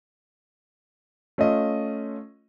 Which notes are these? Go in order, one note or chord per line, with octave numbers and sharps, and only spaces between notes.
A3 C#4 F4 D#5